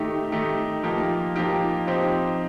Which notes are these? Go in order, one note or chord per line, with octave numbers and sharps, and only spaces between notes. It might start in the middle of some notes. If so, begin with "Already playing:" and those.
Already playing: D#3 A3 D#4 G4
D#3 A3 D#4 G4
F3 A#3 D#4 G4
F3 A#3 D#4 G4
F3 C4 D#4 G4